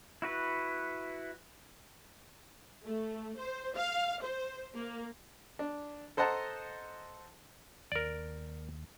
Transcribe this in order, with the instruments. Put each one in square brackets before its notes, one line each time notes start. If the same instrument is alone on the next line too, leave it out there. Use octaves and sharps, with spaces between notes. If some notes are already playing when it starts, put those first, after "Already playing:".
[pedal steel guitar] E4 F#4 B4
[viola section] A3
C5
F5
C5
A#3
[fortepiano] D4
A4 C5 D#5 F#5 A5 A#5
[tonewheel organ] D#2 [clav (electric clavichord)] A#4 D5